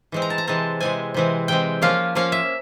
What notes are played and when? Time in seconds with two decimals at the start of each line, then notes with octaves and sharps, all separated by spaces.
0.12 E3 G#3 C4
0.22 A#5
0.30 A5
0.38 A#5
0.47 C3 E3 G#3 C4 A5
0.80 C3 E3 G#3 C4 G#5
1.14 C3 E3 G#3 C4
1.48 C3 E3 G#3 C4 G5
1.82 F3 A#3 C#4 F4 F5
2.15 F3 A#3 C#4 F4 F5
2.32 E5